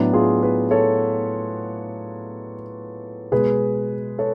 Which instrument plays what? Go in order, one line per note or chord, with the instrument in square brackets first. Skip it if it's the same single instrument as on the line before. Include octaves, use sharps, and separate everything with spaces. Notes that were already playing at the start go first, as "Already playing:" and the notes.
Already playing: [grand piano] A2 F#3 B3 D4
F4 G#4
G#4 B4
A4 C#5
B2 G#3 G#4 B4
A4 C#5